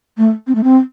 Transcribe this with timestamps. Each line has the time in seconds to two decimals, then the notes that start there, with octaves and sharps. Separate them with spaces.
0.18 A3
0.47 C4
0.55 A3
0.64 C4